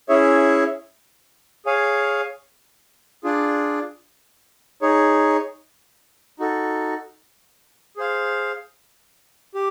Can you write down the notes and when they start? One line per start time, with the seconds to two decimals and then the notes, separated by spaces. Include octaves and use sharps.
0.09 C#4 E4 G#4 C#5 E5
1.66 G#4 C#5 F5 G#5
3.24 D4 F4 G#4
4.82 D#4 G#4 C#5
6.39 D#4 F#4 A4
7.97 G#4 C5 F5
9.54 G4